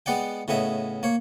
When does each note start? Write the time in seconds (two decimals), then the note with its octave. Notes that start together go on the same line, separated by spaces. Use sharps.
0.06 G#3 B3 D5 F#5 G5
0.48 A2 C#3 B3 D#5 E5
1.03 A#3 C#5